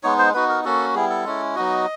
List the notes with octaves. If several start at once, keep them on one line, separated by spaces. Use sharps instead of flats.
G#3 B3 D#4 C#5
C5
B3 D#4 F#4 B4
A#4
A#3 C#4 F#4 A4
G3 B3 E4 G#4
A4
G#3 C#4 E4
F#3 B3 D#4 F#4 D#5